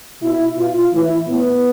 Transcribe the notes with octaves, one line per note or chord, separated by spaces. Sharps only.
B2 E4
B2 F4
A2 E3 E4
A2 E3 B3